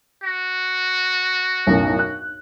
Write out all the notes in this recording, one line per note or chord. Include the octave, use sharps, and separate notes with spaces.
F#4
B1 F#2 A2
F#6